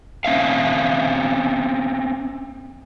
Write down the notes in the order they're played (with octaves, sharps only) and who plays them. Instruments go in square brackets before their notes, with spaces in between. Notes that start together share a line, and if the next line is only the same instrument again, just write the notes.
[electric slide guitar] C4 C#4 E5 F5